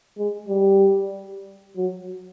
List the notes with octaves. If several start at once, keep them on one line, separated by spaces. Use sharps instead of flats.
G#3
G3
F#3